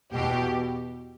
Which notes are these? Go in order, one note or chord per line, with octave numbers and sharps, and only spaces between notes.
E2 B2 G4